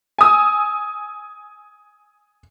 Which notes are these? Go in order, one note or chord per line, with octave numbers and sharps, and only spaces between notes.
G#5 D#6 E6